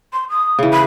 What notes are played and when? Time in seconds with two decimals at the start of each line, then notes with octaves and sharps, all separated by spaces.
0.13 C6
0.30 D#6
0.59 C#3 E3
0.73 G#4 B5